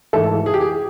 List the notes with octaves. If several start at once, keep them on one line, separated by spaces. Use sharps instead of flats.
G#2 E3 A3 A4
G#4
G4
G#4